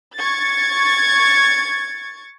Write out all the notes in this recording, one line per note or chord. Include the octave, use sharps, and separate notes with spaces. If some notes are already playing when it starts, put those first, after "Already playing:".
C#6 G#6 A6